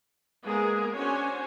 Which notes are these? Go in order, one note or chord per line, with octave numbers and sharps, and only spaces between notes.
G#3 A#3 B3 G#4 A#4
C#4 D4 F#4 C5 C#5 G#5